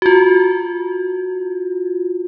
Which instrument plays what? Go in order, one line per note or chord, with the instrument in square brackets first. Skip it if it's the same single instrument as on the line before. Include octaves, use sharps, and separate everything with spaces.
[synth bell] F4 F#4